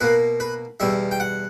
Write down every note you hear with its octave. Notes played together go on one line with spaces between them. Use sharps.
B2 A#3 B4
B4
E2 B2 G3 E5
G5
F#5